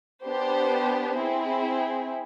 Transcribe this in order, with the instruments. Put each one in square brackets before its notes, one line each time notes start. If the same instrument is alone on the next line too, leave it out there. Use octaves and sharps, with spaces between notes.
[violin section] B3 D4 G4 C5
C4 E4 G#4